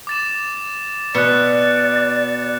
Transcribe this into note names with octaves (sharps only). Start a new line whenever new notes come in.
D6 A6 E7
B2 D5 F#6 C#7